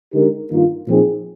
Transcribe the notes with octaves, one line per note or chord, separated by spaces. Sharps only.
D3 G#3 D#4 G4 A#4
G2 D#3 A#3 F4
A#2 F3 C4 D#4 G#4